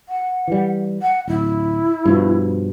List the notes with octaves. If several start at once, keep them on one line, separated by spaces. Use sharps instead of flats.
F#5
E3 G3
F#5
D1 E4
G2 B2 F3